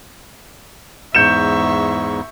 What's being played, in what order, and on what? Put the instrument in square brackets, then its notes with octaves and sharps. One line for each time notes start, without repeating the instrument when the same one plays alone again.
[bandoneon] E2 G#2 [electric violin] E5 C#6 [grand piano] G6 C#7 E7